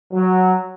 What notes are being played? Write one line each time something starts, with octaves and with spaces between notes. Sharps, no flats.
F#3